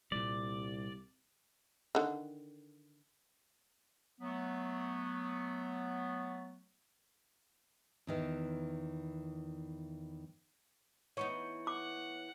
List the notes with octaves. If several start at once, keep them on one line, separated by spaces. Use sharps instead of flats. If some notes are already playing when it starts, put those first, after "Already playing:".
C2 A#2 G3 D5
D3 D#3
F#3 A3 B3
E2 D#3 E3
E3 B3 D#4 C#5 C#6 C#7
F#5 D6